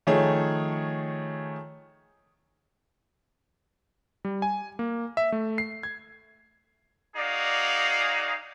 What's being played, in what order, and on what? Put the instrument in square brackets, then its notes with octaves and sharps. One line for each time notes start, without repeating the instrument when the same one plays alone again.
[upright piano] D#3 F3 A3 G#4 C#5
[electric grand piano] G3
G#5
A#3
E5
A3
C7
G#6
[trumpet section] D#4 F#4 G#4 D5 F5